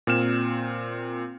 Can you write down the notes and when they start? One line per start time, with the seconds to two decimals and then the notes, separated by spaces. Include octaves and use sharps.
0.07 A#2 C4 F6 E7